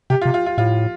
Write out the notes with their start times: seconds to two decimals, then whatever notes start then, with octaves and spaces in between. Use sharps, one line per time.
0.10 C3 G4
0.21 F4
0.26 C3
0.34 F4
0.46 F4
0.58 A2 F4